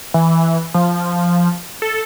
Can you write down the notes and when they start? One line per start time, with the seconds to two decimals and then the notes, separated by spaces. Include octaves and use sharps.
0.14 E3
0.74 F3
1.82 A4